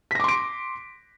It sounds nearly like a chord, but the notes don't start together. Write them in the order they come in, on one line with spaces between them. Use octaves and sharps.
B6 A#6 D6 C6 D7